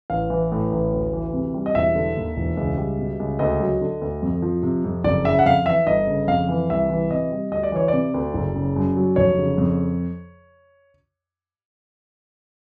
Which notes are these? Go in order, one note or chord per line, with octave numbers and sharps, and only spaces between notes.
A1 F5
E3
A2
A1
D2
E3
C3
G3
D#5
E1 E5
D3
D#2
E1
C#2
G3
B2
C#2
D2 D#5
F#3
D3
D2
F2
F3
C3
F2
F#1 D5
C#3 E5
F#5
F2 F5
E3 E5
G1 D#5
C#3
F2 F5
E3
C2 E5
E3
C3 D#5
G3
D2 D#5
D5
E3 C#5
C3 D5
D2
F#1
C#3
F#2
F#3
F1 C#5
C#3
F2